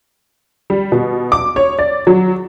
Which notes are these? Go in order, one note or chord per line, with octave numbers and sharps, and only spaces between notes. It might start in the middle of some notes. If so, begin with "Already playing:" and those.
G3
B2
D6
C#5
D5
F#3